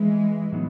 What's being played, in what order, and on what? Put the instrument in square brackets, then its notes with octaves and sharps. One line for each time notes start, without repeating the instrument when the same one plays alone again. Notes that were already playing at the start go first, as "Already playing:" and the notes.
Already playing: [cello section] E3 G#3
[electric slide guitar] A2 F#3 B3 D#4